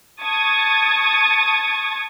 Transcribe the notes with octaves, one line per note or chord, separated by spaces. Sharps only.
A5 C#6 D#6 G#6 A6